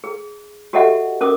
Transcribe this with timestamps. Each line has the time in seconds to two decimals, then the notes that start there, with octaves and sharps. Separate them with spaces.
0.04 G#4
0.73 F#4 G4 A4 D#5 E5 F#5
1.21 C#4 A#4 D6 D#6